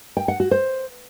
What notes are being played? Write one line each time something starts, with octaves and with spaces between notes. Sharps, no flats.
G5
F#5
F#4
C5